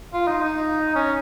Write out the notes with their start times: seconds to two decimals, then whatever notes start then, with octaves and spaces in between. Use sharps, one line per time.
0.13 F4
0.27 D#4
0.42 D#4
0.96 C#4